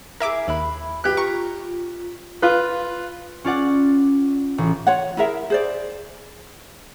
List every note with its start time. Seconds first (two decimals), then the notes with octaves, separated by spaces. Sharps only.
0.20 E4 G#4 A#4 E5 D6
0.48 D#2 E4 B5 F#6
1.04 G4 B4 F#6
1.17 F4 A#5 C#6
2.42 F4 B4
3.44 C#4 F4 D5 F#5
4.58 A1
4.87 F4 C#5 F#5
5.17 E4 G#4 A#4 E5
5.50 G#4 C5 D5